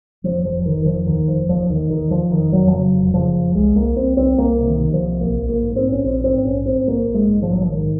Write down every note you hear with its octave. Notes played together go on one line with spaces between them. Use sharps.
F1 F3
F1 F3
F1 D#3
D#3
F1 F3
D#2 D#3
F1 F3
D#2 F3
D#2 D#3
D#2 D#3
D#2 F3
F1 D#3
F1 F#3
F3
C#3 F#3
F1
C#3 F3
F1
C2 G#3
C2 A#3
C2 C4
C2 C4
C2 A#3
C3
D#3
C3
F3
C2
A#1 A#3
A#1
A#3
G#2
C4
A#1
C#4
A#1 C4
G#2 C4
A#1 C#4
G#2 C4
A#1 A#3
A#1
G#3
G#2
F3
A#1 F#3
F3
G#2 D#3